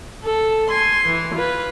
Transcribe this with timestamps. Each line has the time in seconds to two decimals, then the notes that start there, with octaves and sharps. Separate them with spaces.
0.23 A4
0.68 G#5 C6
1.06 E3
1.35 F4 B4